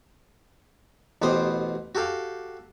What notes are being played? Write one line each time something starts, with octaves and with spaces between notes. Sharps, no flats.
A1 B2 B3 G4 C5 D#6
F#4 G4 A4 F5